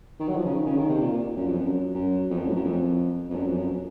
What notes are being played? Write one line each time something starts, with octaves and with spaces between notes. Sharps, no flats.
D#3
F#3
F3
C#3
D#3
C#3
D#3
C3
A#2
A#2
F#2
F2
F#2
F#2
F2
F#2
A2
F#2
F2
F2
F#2
F2
F#2